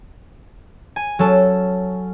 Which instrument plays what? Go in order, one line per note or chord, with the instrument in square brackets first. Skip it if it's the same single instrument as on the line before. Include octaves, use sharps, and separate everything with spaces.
[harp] G#5
[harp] F#3 A4 [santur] C#4